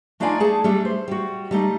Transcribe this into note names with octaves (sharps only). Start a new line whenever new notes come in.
A3 D4 D#4 F4 D5 G#5
A3 G#4 A5
G3 A3 D4
C5
G3 F#4
G3 A3 D#4